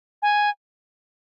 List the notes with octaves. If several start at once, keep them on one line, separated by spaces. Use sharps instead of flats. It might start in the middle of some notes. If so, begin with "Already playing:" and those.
G#5